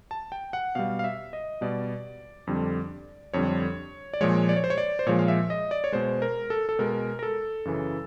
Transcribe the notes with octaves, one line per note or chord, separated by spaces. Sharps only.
A5
G5
F#5
B2 G3 F5
F5
E5
D#5
B2 G3 D5
F2 D3 G3
F2 D3 G3 C#5
D5
A#2 F3 G#3 C#5
D5
C#5
C5
C#5
D5
C5
A#2 F3 G#3 C#5
F5
E5
D#5
D5
C#5
B2 G#3 C5
A#4
A4
A4
B2 G#3 A#4
A#4
A4
F#2 C#3 E3